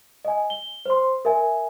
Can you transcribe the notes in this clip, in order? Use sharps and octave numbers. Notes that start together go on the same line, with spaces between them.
D#5 G#5
G7
C5 C6
A#4 E5 G#5